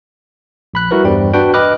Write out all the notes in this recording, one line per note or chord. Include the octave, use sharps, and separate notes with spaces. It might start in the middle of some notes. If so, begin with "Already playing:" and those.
A#1 B5 F#6
G3 E4 F#4 A#4 B4
E2 G2 G3 C5 G5
D4 F#4 B4 G5
B4 D#5 B5 D6 F6 F#6